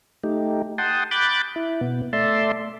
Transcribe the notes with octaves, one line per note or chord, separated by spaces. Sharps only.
A3 D#4 G4
F#5 G5 A5 C6 D#6
B5 D6 F#6 G6 A6
E4
B2 B3
A3 D5 E5 A5 C6